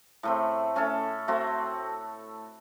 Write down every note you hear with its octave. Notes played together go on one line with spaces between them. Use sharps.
A2 A3 C4
A3 C#4 A4
A3 C4 F#4